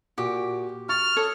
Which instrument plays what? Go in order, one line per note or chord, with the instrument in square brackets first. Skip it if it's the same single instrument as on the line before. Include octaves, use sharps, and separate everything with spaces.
[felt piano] A#2 F#4 D6 [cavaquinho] G4
[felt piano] C#6 A6 [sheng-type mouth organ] F6
[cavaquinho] A4 C#5 D#6